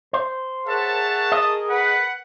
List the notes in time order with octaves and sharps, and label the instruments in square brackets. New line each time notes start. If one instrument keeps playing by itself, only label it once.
[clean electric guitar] C5
[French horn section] G#4 A#4 [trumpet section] C#5 E5 A5 [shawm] F#5
[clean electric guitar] D#5 [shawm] D#6
[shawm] B4 [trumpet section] F#5